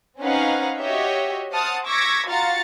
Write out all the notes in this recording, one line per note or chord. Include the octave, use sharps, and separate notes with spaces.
C4 C#4 D#4 B4 F5 F#5
F#4 G4 C#5 D#5 E5
C5 F#5 A5 D#6 F6 A6
C#6 D6 E6 G#6 A#6 B6
F4 F#4 F5 A#5 A6 C#7